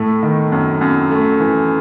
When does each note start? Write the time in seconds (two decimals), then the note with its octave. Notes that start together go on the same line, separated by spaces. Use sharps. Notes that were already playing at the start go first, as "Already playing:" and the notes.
Already playing: A2 A3
0.23 D#3
0.52 F#2
0.81 F#2
1.11 A3
1.40 E3